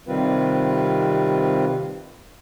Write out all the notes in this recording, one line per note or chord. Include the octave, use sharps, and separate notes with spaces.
C3 D#3 G3 C4 F4 B4